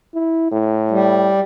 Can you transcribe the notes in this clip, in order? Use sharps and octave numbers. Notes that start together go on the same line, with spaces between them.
E4
A2
G3